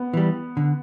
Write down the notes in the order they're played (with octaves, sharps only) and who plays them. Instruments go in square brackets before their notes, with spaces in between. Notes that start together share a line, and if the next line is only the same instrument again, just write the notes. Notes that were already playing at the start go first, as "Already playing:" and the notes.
Already playing: [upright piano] B3
[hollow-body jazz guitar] E3 G3
D3